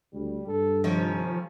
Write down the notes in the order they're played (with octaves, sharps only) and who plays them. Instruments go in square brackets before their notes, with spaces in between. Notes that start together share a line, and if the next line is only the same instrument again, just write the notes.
[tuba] D2 [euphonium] G3
[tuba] G2 [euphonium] A4
[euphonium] C3 [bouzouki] D#3 C#4 A4 [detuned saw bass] F3